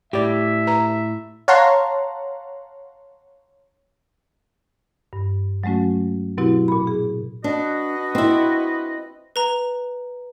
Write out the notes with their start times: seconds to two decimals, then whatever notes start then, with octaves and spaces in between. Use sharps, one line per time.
0.13 A2 G4 D5 E5
0.67 B4 A#5
1.48 C#5 F5 F#5 A5 A#5 C6
5.13 G2
5.64 F#3 G#3 A3 C#4 F#4
6.38 B2 F#3 C4 E4 F#4 G4
6.68 A#2 B5
6.87 G#4
7.44 D4 F#4 B4 D#5
8.15 C4 E4
9.36 B4 A#5